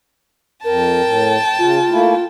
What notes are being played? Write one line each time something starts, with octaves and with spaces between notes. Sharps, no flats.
F2 A#4 G5 A5
A2
C#3 F4
A3 A#3 E4